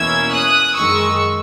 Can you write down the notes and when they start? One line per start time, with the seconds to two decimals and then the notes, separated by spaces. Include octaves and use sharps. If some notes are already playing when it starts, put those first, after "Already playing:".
Already playing: E2 B2 A#3 C#4 E4 E6 G#6
0.32 D#6 F#6
0.75 F#2 D#3 G#3 C#6 E6